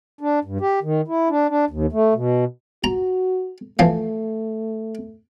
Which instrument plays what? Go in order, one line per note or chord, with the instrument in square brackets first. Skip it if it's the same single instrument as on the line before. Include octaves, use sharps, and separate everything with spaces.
[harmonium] D4
G2
G4
D#3
E4
D4
D4
D#2
A3
B2
[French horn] F#4 [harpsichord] A#5
[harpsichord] E3 F3 [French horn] A3